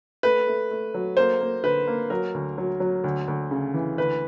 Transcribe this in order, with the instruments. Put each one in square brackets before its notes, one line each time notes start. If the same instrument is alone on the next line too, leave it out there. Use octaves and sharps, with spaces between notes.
[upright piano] A3 B4
A3
A3
F#3
A#3 C5
A#3
D3 B4
A#3
F#3 A#4
D2
F#3
F#3
D2
D2
C#3
E3
D2 B4